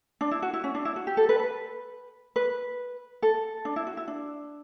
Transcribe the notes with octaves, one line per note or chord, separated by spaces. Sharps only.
D4
E4
F#4
E4
C#4
D4
E4
F#4
G4
A4
B4
B4
B4
A4
D4
E4
F#4
E4
D4